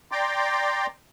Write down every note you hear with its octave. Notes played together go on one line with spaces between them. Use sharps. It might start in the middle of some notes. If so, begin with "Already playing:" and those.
D5 G5 A#5 C6 D6